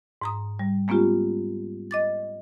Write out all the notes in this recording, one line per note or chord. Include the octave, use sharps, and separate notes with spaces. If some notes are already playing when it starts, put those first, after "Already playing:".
G#2 A#5 D#6
G3
G#3 A#3 B3 C#4 F4 G4
D#5 D6 A6